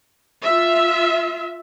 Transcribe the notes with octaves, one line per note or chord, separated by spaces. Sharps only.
F4 E5